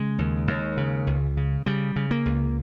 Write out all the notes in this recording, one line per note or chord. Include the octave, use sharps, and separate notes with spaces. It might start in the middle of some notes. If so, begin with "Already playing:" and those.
Already playing: C#3 G#3
D#2
D#2
C#3
C#2
C#3
C#3 G3
C#3
A#3
C#2